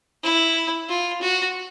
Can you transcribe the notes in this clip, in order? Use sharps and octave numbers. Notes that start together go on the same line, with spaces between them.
E4
F4
F#4